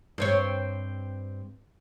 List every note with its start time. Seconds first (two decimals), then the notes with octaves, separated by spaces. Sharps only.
0.18 G2 C4 C#5